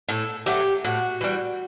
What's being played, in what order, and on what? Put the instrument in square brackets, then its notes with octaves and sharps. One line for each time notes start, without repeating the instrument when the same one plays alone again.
[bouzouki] A2 A4
F#3 A3 G4
A2 F#4
E3 G3